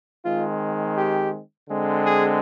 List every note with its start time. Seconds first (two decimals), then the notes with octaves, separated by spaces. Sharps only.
0.25 D#3 G#3 C4 F4
0.97 G4
1.68 D3 G#3 C4
2.05 G#4